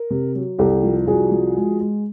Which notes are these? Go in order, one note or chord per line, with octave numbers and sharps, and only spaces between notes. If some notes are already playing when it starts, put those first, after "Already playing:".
Already playing: A#4
C3
F#3
C2 G4 A4
F3
C2 F#4 G#4
F3
G#3
G#3